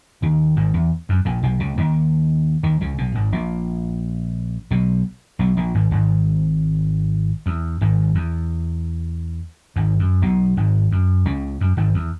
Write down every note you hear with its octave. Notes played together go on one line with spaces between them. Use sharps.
D#2 D#3
G#1 G#2
E2
F#2
A#1 A#2
B1 B2
C#2 C#3
D#2 D#3
D#2 D#3
C#2 C#3
B1 B2
G#1 G#2
A#1 A#2
B1 B2
B1 B2
A#1 A#2
G#1 G#2
G#1 G#2
E2
G#1 G#2
E2
G#1 G#2
F#2
B1 B2
G#1 G#2
F#2
C#2 C#3
F#2
G#1 G#2
E2